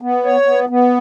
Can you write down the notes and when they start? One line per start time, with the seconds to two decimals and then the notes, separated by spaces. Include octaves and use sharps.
0.02 B3
0.25 C#5
0.46 B3
0.69 B3